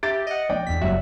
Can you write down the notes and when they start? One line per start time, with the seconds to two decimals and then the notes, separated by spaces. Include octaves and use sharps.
0.03 G4 E5 A6 D7
0.27 D#5 F#5
0.50 F3 D5 G5
0.67 E2 C4 D4 B6
0.82 F#1 F#3 G3 F#4 E5